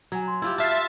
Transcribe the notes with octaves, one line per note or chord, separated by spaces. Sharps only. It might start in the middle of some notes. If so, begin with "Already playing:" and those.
F#3 G#5 A#5
C6
E4 F4 G4
F4 E5 A5 F6 A6 C7
C6